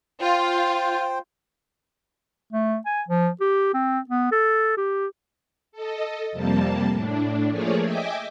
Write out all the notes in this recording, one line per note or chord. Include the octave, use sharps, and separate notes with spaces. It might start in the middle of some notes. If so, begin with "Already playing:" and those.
F4 C5 G5
A3
G#5
F3
G4
C4
B3
A4
G4
A4 D#5
F2 C3 G3 A#3 A5
A2 D4
F3 A3 A#3 G#4 C#5 D5
D#5 E5 G5 G#5 D6